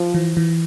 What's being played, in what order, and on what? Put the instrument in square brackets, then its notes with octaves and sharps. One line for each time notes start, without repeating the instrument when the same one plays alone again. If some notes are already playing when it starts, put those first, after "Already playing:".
Already playing: [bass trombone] F3
[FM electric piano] E3
E3